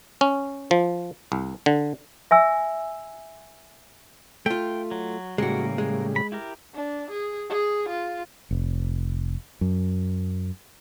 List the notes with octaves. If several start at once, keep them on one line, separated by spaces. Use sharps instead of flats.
C#4
F3
C2
D3
E5 G#5 E6
A3 F4 G5
F#3
A2 C#3 E3 G3 G#3 A#3 F#4 A#4
G#3
B5
E4 G4 A#4
D4
G#4
G#4
F4
F1
F#2